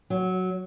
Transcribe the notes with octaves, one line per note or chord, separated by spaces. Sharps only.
F#3